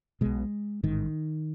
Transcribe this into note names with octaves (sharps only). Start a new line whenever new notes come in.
B1 B2 G#3
A1 G#2 D#3